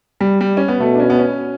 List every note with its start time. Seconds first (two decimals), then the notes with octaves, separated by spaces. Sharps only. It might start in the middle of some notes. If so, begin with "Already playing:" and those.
0.21 G3
0.41 G3
0.57 C#4
0.68 B3
0.80 B2 A3
0.95 D4
1.00 C#4
1.10 B3
1.19 C#4